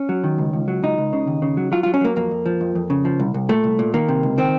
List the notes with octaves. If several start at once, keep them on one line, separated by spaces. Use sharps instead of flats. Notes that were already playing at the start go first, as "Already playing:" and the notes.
Already playing: C#4
F#3
D#3
C#2
C#2
F#3
C#2 D#4
C#2
C#3
D#2
C#3
F#3
F#3 F4
F#3 F4
C#4
F#3 A#3
F2 A#3
F2
F3
F2
F2
C#3
F3
C2
C2
A#2 A3
C2
A#2
D#3 A#3
C3
C#2
D#3 C4